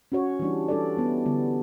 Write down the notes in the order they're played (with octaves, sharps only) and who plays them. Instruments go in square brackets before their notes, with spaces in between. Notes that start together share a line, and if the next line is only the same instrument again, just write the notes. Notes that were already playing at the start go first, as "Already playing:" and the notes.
[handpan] C#4 F#4 C#5
E3 G3 D4
G3 D4 A4 D5
G3 B3 E4
D3 G3 B3